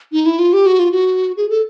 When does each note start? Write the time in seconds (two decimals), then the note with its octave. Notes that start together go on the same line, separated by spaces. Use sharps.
0.12 D#4
0.26 E4
0.39 F4
0.53 G4
0.66 F#4
0.79 F4
0.92 F#4
1.37 G#4
1.49 A4